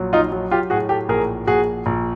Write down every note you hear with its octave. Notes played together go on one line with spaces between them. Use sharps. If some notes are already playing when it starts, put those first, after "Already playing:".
Already playing: A#1 F#3
D#4 F4
F#3
F4 G4
A2 F#4 G#4
G4 A4
A#1 G#4 A#4
A#1 F#4 G#4
A#1